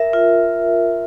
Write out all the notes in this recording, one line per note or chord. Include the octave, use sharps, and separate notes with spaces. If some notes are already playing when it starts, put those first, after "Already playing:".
Already playing: A#4 E5
F4